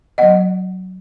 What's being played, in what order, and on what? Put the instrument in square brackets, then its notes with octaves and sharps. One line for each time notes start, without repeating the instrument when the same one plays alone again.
[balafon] F#3 B3 D#5 F#5